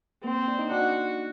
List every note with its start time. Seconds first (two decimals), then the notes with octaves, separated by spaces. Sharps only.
0.24 A#3 C4
0.48 D4
0.59 D#4
0.71 D4 F#4